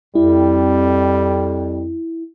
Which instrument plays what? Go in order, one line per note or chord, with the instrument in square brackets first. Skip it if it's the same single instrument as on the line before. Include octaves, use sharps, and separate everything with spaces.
[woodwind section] F2 [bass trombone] G3 [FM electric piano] E4